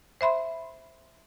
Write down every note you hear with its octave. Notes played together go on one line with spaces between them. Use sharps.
C5 E5 B5 C6